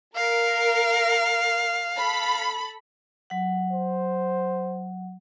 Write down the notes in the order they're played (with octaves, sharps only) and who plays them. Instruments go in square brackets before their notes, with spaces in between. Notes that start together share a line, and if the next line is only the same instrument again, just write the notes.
[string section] A#4 [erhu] F5
[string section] A4 B5
[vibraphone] F#3 F#5
[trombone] C5